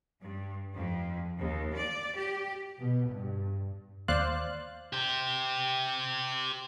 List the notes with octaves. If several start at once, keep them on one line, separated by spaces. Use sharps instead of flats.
G2
F2
D#2
D5
G4
B2
G2
D#2 C5 D5 F5 F#6
G4 C5